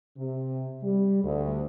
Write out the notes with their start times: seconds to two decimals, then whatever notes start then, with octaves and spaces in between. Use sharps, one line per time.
0.18 C3
0.83 G3
1.24 D2